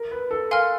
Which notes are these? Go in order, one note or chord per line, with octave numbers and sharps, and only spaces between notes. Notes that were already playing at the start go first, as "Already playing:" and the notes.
Already playing: A#4
B4
A4
A#4 F5 G#5 C6 F6